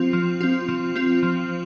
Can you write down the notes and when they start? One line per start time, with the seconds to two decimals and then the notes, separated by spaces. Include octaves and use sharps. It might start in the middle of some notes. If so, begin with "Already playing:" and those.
Already playing: F3 C4 F4
0.13 F3
0.41 C4 F4
0.68 F3
0.96 C4 F4
1.23 F3